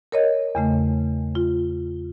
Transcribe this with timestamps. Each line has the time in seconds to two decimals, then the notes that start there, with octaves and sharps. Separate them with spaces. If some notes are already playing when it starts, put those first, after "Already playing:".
0.12 A#4 C#5 D#5
0.55 E2 C#3 A3
1.35 F4